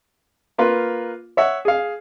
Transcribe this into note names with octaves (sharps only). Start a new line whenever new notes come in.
A#3 F4 B4
C#5 E5 F#5
G#4 F5